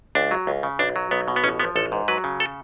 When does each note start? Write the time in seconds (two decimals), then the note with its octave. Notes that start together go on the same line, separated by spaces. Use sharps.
0.15 C#2 D4
0.31 F#3
0.47 C#2
0.63 C#3
0.79 B1 D4
0.96 F#3
1.11 B1 B3
1.28 B2
1.36 B3
1.44 A1 C#4
1.60 F3 B3
1.76 A1 A4
1.92 G#2
2.08 F#3 B4
2.24 C#3
2.40 A4